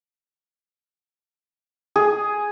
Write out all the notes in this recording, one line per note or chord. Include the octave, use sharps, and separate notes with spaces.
G#4